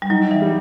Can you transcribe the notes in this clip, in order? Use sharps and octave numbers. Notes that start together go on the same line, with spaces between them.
G3
F#3 D#4
E3
G3